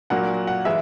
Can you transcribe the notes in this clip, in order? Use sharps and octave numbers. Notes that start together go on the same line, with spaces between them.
A#2 F#3 A#3 D4 F#5
F#5
E3 G#3 E5